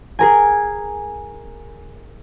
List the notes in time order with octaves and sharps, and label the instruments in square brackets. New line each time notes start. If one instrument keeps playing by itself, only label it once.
[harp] G#4 A#4 G#5